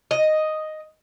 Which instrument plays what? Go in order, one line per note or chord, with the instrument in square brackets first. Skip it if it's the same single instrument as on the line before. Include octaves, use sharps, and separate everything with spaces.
[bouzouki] D#5